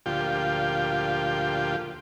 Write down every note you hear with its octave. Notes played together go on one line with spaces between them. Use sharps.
D2 A#2 F3 F4 G4 G5